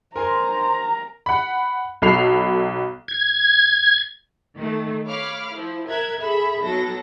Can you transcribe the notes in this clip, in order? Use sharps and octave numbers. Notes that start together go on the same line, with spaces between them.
A#4 C5 G#5 A#5 C6
F#5 B5
B1 A4 B5 C7 F7
G#6
D#3 A3
C#5 F5 B5 D6 F6
F3 E4
A#4 E5 A#5 F#6 G#6
G#4 A4 E5 B5
B1 F#3 B3 A4 A#6